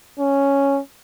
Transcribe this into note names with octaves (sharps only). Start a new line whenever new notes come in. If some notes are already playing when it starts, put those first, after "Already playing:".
C#4